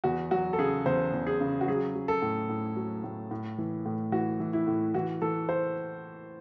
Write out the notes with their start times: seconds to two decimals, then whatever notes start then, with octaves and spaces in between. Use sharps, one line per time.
0.04 E2 F#4
0.31 F#3 F#4
0.53 A4
0.59 C#3 G#4
0.86 E2 C5
1.13 E2
1.27 G#4
1.41 C#3
1.61 F#4
1.68 F#3 G#4
1.95 F#3
2.08 A4
2.22 A2
2.49 A2
2.76 F#3
3.04 A2
3.31 A2
3.58 E3
3.86 A2
4.12 E3 F#4
4.40 E3
4.53 E4
4.67 A2
4.94 E3 F#4
5.22 E3 A4
5.49 C5